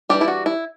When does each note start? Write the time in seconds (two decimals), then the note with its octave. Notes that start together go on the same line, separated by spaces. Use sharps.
0.09 E3 G3 D4 G4
0.21 E4
0.28 F#4
0.46 E4